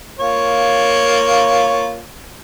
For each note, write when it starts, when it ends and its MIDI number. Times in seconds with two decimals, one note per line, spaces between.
0.19 1.99 58
0.19 1.99 65
0.19 1.99 73